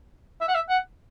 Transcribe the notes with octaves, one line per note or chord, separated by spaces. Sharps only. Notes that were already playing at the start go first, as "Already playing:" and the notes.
E5
F#5
E5
F#5